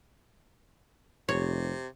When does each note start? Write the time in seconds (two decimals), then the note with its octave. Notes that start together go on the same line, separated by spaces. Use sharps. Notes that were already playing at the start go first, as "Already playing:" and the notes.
1.29 F1 C3 C#5